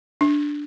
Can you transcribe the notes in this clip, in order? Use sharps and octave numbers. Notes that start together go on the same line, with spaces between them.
D4